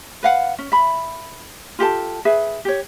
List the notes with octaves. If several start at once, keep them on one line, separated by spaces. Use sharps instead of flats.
B4 F5 F#5
C#4
E5 B5
F4 G4 A4 A5
G#4 B4 E5
G4 C#5